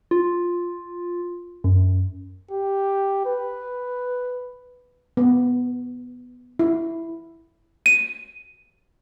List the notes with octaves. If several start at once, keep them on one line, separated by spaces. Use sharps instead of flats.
F4
F#2
G4
B4
B3
E4
D#7